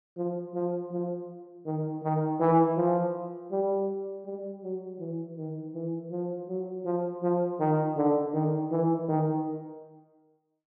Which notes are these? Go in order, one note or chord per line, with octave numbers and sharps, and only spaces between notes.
F3
F3
F3
D#3
D#3
E3
F3
G3
G3
F#3
E3
D#3
E3
F3
F#3
F3
F3
D#3
D3
D#3
E3
D#3